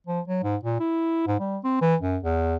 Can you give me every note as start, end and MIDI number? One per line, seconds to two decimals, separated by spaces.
0.07 0.20 53
0.28 0.41 54
0.43 0.56 44
0.63 0.78 46
0.80 1.27 64
1.27 1.35 44
1.39 1.58 55
1.64 1.81 60
1.81 1.96 52
2.01 2.18 42
2.23 2.56 40